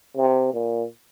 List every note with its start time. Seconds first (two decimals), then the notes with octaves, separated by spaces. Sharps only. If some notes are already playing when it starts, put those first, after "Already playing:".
0.17 C3
0.53 A#2